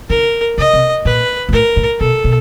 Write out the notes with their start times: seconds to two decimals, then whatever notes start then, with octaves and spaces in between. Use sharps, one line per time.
0.10 D3 A#4
0.58 C#3 D#5
0.73 C3
1.05 A#2 B4
1.49 A#2
1.53 A2 A#4
1.76 A2
2.00 B2 A4
2.24 B2